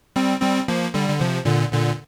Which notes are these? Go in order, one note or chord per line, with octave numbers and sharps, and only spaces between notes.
G3 C4
G3 C4
F3 A#3
D3 G3
D3
C3 F3
A#2 D3
A#2 D3